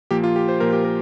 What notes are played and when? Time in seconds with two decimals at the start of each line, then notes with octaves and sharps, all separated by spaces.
0.11 A#2 F3 A#3 G4
0.24 F4
0.36 G4
0.48 C5
0.60 A#2 F3 A#3 A#4
0.73 G4
0.85 A#4